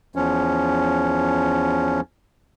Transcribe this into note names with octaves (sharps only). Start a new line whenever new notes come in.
E2 F3 C#4